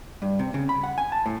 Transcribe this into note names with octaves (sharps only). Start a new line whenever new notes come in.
G2
C3
C#3
B5
F#5
G#5
A5
A2